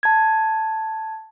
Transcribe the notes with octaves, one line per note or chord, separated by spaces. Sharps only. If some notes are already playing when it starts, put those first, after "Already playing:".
A5 G#6